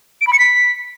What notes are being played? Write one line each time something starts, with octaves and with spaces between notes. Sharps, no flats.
D7
B5
C#7
B6